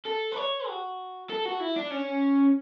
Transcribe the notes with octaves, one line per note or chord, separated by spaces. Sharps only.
A4
B4
C#5
F#4
A4
F#4
E4
D4
C#4